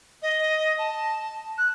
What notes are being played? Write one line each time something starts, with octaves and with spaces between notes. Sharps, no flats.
D#5
A5
F#6